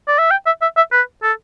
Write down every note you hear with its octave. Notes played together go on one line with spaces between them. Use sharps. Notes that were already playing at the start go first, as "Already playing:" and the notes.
D5
E5
G5
E5
E5
E5
B4
A4